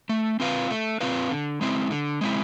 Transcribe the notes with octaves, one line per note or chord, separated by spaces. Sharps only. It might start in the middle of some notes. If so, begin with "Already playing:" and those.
A3
C4 F4 B4 F5
A3
C4 F4 B4 F5
D3
G#3 C4 E4
D3
G#3 C4 E4